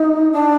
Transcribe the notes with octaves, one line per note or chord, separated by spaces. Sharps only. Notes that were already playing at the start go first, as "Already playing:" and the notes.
Already playing: D#4
D4